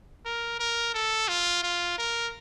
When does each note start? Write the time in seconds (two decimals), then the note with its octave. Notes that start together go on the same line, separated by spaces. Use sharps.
0.25 A#4
0.59 A#4
0.94 A4
1.28 F4
1.63 F4
1.98 A#4